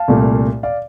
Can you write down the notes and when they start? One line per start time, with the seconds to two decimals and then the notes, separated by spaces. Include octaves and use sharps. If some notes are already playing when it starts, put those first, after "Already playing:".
Already playing: F5 A5
0.08 C2 A#2 A3
0.63 D5 F5